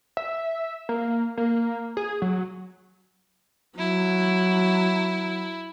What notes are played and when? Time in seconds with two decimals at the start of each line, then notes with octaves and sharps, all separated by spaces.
0.17 E5
0.89 A#3
1.37 A#3
1.97 G#4
2.22 F#3
3.78 F#3 E4